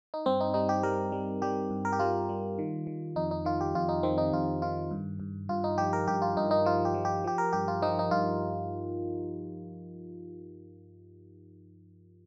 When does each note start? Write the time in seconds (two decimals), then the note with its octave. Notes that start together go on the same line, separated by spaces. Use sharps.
0.14 D#4
0.26 G2 C4
0.40 D#4
0.54 G3 D#4
0.69 G4
0.83 G3 A#4
1.12 G3
1.42 G3 G4
1.70 G2
1.85 A#4
1.93 G4
1.99 G3 F4
2.29 G3
2.59 D#3
2.87 D#3
3.16 F2 D#4
3.31 D#4
3.45 D#3 F4
3.61 G4
3.75 F2 F4
3.89 D#4
4.03 D#3 C4
4.18 D#4
4.33 F2 F4
4.62 D#3 F4
4.91 G2
5.20 G2
5.49 G2 F4
5.64 D#4
5.78 F3 G4
5.93 A#4
6.08 G2 G4
6.22 F4
6.37 G2 D#4
6.51 D#4
6.65 F3 F4
6.85 G4
6.94 F3
7.05 G4
7.24 F3 G4
7.38 A#4
7.53 G2 G4
7.68 F4
7.82 F3 D#4
7.99 D#4
8.11 G2 F4